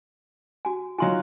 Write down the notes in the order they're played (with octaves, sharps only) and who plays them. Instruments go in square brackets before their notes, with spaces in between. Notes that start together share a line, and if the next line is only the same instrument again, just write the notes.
[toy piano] F#4 G#5
[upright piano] F#3 D#4 F4 [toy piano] G#5 C6